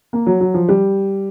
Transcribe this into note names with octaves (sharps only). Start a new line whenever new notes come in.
A#3
F#3
F#3
F3
G3